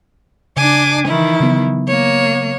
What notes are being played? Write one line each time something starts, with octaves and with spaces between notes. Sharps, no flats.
C#3 D4 G#5 D6
D#3 E3 E4
C#3 F#3 B3
A#3 C#5